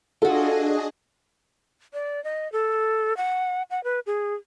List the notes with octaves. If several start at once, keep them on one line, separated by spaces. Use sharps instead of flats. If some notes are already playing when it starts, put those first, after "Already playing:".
D4 F4 F#4 G#4 A4 D#5
D5
D#5
A4
F#5
F#5
B4
G#4